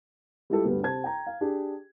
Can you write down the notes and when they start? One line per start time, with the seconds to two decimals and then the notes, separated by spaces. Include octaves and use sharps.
0.50 G3 G#3 E4 F4 G4 A4
0.65 D2 G2 G3 B3
0.83 C3 C5 A5 G#6
1.04 G5 A#5
1.27 F5
1.41 D4 G4 G#4